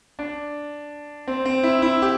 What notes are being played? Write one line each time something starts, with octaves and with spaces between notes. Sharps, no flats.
D4
C4
C4
E4
E4
G4